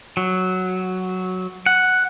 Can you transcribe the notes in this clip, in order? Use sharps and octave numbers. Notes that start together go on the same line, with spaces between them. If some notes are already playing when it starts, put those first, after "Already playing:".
F#3
F#5